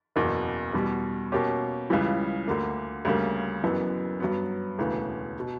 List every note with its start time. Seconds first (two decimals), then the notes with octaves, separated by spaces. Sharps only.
0.16 F#1 E2 B2 A#3
0.73 E2 B2 G3
1.32 B2 A#3 C#4 G4
1.90 C#2 C#3 E3 G3
2.48 D2 D3 A#3
3.05 D2 C#3 G3 A#3
3.63 F#1 F#2 E3 B3
4.20 G2 F#3 B3
4.78 E1 D2 C#3 E3 B3
5.40 B2